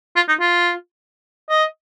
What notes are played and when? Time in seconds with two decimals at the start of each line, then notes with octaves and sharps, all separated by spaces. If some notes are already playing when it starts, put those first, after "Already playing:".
0.16 F4
0.29 D#4
0.40 F4
1.49 D#5